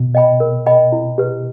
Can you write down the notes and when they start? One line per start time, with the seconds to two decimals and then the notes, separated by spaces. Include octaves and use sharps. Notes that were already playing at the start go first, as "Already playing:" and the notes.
Already playing: B2
0.15 D#5 G5 B5
0.40 A#4
0.66 D#5 G5 B5
0.92 E4
1.18 G4 B4